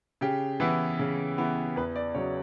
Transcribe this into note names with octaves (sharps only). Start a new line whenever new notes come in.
C#3 G4
E3 B3 E4
C#3
E3 B3 E4
E2 B4
D5
C#3 F#3 C#5